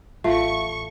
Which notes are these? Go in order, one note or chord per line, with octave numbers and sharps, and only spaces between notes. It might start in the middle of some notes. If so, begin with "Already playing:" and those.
A1 A3 F4 E5 F5 C#6